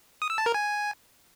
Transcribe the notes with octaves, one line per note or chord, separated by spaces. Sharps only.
D#6
E6
A5
A#4
G#5